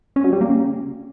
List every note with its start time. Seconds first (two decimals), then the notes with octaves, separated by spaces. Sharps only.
0.16 C#4
0.24 F#3
0.33 G3
0.41 A#3
0.49 C#3